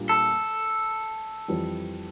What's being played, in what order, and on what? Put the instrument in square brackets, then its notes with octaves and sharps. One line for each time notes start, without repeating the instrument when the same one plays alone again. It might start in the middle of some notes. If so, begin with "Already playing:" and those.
Already playing: [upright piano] A#2 G3 A#3 D4
[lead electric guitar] A4
[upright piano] F2 E3 G3